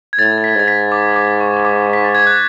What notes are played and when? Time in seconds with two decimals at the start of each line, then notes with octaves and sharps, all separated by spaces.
0.13 G#6
0.19 A2 A6
0.38 A6
0.44 B6
0.56 G#2 A6
0.68 B6
0.92 D6
1.16 D6
1.41 C#6
1.65 D6
1.93 B6
2.04 A6
2.15 G#6
2.27 F#6